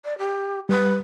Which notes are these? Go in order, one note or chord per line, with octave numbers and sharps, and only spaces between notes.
D5
G4
G3 B4